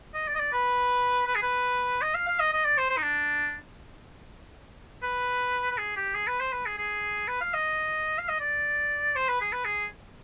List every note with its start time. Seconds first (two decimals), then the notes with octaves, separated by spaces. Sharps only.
0.14 D#5
0.28 D5
0.35 D#5
0.40 D5
0.53 B4
1.27 B4
1.35 G#4
1.42 B4
2.02 D#5
2.14 F5
2.27 F5
2.40 D#5
2.53 D#5
2.65 D5
2.77 C5
2.90 C5
2.97 D#4
3.03 D4
5.03 B4
5.71 B4
5.78 G#4
5.96 G4
6.15 G#4
6.27 B4
6.40 C5
6.53 B4
6.66 G#4
6.78 G#4
7.28 B4
7.41 F5
7.54 D#5
8.18 F5
8.29 D#5
8.40 D5
9.16 C5
9.29 B4
9.41 G#4
9.52 B4
9.65 G#4